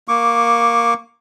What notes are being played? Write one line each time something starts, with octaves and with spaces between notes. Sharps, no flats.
A#3 C#6 D6